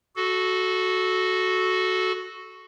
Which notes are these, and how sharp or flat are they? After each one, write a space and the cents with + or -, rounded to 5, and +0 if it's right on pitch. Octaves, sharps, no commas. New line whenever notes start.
F#4 +0 A4 -15